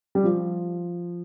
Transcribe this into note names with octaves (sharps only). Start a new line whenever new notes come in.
G3
F3